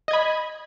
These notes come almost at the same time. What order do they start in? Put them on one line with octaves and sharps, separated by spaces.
D#5 G#6 B5